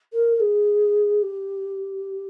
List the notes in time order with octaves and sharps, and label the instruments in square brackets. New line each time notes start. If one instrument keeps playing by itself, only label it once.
[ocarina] A#4
A#4
G#4
G4